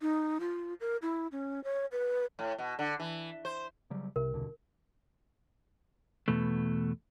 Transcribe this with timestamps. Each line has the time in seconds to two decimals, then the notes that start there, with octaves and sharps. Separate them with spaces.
0.02 D#4
0.40 F4
0.80 A#4
1.02 E4
1.32 C#4
1.64 C#5
1.92 B4
2.39 A2
2.58 B2
2.79 D3
3.00 E3
3.45 C5
3.90 C#3 F#3 G3
4.16 C2 C3 A#4
4.33 D#2 B2 D3
6.28 E2 B2 A3